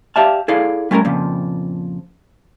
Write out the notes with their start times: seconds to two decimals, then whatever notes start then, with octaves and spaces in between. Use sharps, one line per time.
0.16 G4 D5 E5 F5 A5
0.48 E4 G#4 A4 D5 F5
0.91 G3 A3 C#4 F#4 A#4
1.05 F2 A#2 C#3 F3